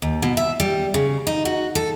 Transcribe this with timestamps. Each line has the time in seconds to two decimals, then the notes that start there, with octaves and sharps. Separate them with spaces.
0.02 D#2
0.22 B2
0.37 E5
0.60 G3
0.94 C#3
1.27 D#4
1.45 F#4
1.75 A4